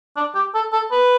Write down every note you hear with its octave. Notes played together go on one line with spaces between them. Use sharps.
D4
G4
A4
A4
B4